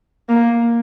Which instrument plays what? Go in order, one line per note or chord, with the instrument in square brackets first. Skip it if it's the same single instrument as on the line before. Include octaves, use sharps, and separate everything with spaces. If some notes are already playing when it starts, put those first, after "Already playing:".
[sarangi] A#3